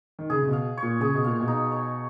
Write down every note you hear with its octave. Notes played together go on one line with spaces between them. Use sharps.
D#3
C#3 G#4
C#3
B2
F5
C#5
A#2
C#3 G#4
B2
A#2 F5
B2
D#4
C#5